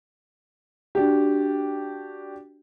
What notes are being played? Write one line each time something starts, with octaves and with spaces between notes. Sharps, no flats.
D4 F#4 G4